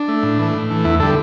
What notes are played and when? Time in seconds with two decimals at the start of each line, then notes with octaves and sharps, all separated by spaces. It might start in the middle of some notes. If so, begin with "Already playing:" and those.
Already playing: D4
0.08 A3
0.23 A2
0.39 E3 A3
0.55 A2
0.70 E3 A3
0.84 E2 E4
1.00 D3 G3 A4